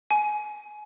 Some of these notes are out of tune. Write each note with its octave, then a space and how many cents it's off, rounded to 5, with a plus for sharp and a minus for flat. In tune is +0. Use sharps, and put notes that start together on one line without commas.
G#5 +20